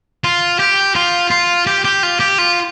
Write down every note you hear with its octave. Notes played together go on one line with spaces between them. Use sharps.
F4
G4
F4
F4
G4
G4
F4
G4
F4